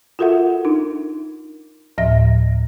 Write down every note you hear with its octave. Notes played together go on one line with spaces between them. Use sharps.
F4 F#4 A4 A#4 E5 F#5
D4 D#4 A#4
D2 A2 F3 E5 A#6